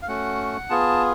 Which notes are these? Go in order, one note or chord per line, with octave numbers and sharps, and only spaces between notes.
F5
A3 C#4 F#4 F#5
B3 F4 G#4 A5